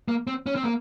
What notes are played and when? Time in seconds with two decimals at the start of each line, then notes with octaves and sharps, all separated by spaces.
0.08 A#3
0.27 C4
0.46 C#4
0.55 C4
0.63 A#3